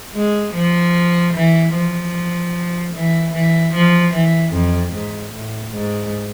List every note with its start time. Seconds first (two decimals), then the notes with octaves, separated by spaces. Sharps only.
0.14 G#3
0.54 F3
1.34 E3
1.74 F3
2.94 E3
3.34 E3
3.74 F3
4.14 E3
4.53 F2
4.93 G#2
5.33 A2
5.73 G#2